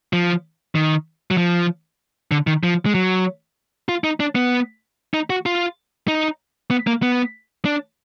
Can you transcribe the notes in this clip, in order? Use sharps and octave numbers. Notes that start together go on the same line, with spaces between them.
F3
D#3
F#3
F3
D3
D#3
F3
G#3
F#3
F4
D#4
D4
B3
D#4
F#4
F4
D#4
B3
A#3
B3
D4